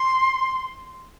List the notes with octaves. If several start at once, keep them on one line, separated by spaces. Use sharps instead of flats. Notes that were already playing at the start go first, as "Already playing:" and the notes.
Already playing: C6